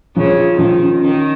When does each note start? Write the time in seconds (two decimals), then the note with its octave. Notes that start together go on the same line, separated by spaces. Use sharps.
0.16 C#3 F3
0.37 F4
0.58 D#3 F3
0.80 C#4
1.02 D#3 C#4